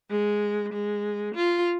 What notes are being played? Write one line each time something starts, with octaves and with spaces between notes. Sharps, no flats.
G#3
G#3
F4